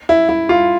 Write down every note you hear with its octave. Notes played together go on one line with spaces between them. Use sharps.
E4
E4
F4